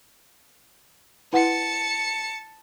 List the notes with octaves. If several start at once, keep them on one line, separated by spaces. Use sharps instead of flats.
E4 B4 F#5 A5 C#7